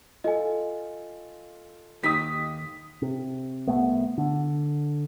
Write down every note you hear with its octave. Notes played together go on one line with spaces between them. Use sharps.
F4 A4 D#5 G#5
D#2 D#4 G4 D#6 B6
C3
C2 A3 B3
D3